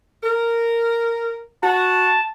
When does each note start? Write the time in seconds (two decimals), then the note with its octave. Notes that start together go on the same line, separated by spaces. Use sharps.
0.23 A#4
1.64 F#4 A5